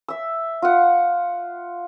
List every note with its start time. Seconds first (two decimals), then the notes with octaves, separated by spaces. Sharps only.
0.08 E5 E6
0.62 F4 F#5